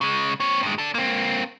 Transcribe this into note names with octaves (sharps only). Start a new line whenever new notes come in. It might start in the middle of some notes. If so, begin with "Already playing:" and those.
C#3 G#3
C4 C#5
G2 G#3
D4 A4
A#3 C4